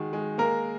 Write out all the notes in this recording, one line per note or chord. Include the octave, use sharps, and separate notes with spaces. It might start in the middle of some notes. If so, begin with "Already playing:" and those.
Already playing: D#3 G#3 F#4
G#3
A#3 A#4